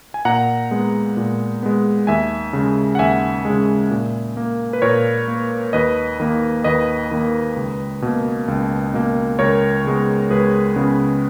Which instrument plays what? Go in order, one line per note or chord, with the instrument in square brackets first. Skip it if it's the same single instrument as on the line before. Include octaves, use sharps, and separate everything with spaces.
[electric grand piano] G#5
A#2 F#5 A#5
G#3 B3
A#2
G#3 B3
D#2 E5 G#5
C#3 G#3
F#5
D#2 E5 G#5
C#3 G#3
A#2
A#3
B4
A#2 A#4 C#5
A#3
D#2 B4 D#5
D#3 A#3
D#2 B4 D#5
D#3 A#3
C#2
B2 A#3
C#2
B2 A#3
C#2 A#4 C#5
C#3 G#3 B3
C#2 G#4 B4
C#3 G#3 B3